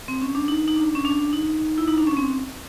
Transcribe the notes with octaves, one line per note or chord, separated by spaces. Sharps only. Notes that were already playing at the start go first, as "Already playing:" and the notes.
C4
C#4
D4
D#4
D#4
D4
C#4
D4
D#4
E4
D#4
D4
C#4
C4